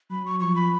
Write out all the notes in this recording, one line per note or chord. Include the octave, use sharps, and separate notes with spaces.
F#3 B5
C#6
F3 C#6
B5